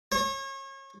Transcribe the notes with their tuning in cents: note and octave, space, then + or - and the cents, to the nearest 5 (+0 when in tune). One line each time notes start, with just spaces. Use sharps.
C#5 -35